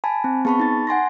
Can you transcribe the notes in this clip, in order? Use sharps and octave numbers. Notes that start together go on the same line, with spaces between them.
G#5 A5 B5
C4
B3 G#4 A5 B5 C#6
D#4 A6
F#5 G#5 C6 A#6